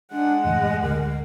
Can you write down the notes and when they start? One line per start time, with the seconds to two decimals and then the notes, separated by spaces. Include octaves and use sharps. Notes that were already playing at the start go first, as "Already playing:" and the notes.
0.12 G#3 D4 F#5
0.44 F#1 E2 A2 D#5
0.82 D2 G#2 D3 A#4